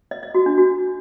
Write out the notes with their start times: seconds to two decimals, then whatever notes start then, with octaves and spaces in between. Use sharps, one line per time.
0.11 D#5
0.23 D#5
0.35 F#4
0.46 D4
0.58 F#4